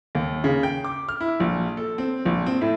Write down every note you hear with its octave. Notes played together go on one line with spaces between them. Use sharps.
D#2
C#3
G5
D6
F6
E4
A#1
A4
C4
A#1
C4
A2